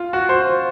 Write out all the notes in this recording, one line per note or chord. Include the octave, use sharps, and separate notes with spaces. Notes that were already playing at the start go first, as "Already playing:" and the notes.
Already playing: F4
F#4
C5